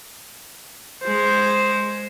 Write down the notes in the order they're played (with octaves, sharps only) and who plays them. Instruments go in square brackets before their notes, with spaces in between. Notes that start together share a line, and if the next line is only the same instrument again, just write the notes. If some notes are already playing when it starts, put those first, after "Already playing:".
[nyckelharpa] G#3 C5